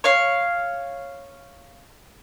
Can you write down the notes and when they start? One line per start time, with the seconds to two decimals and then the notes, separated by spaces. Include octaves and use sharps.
0.04 C#5 F5